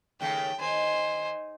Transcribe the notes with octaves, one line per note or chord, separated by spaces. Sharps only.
D#2 C#3 A3 G5
D#3 C5 G#5